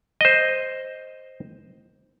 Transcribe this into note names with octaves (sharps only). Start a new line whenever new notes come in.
C5 D#5